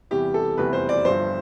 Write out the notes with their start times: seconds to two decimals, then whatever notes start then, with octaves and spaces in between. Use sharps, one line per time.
0.11 E2 C3 E3 G3 G4
0.34 A4
0.58 F1 E2 C3 E3 G3 B4
0.73 C5
0.89 D5
1.05 G1 G2 F3 C5